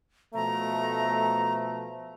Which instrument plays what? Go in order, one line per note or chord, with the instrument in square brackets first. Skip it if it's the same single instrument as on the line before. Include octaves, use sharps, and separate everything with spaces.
[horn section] B2 F3 A3 [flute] A#5